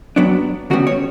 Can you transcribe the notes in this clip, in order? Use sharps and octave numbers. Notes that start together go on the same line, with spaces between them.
G2 F#3 B3 D4
D2 C#3 G3 B3 F#4
C#5